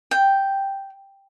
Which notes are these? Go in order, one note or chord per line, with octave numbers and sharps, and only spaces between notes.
G5